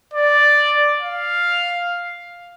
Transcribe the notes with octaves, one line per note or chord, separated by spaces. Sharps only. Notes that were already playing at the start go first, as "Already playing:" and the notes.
D5
F5